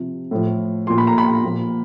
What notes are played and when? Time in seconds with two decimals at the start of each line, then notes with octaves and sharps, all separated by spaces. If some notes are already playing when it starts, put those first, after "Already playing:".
Already playing: C3 F3
0.31 A2 F3
0.87 A#2 F3 C6
0.98 B5
1.07 A#5
1.18 B5
1.44 A#2 F3